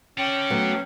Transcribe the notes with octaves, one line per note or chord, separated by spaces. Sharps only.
C#4 A4 D5 G5
F#3 A3 B3